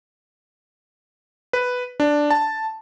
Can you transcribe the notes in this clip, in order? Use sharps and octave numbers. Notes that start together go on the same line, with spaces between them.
B4
D4
A5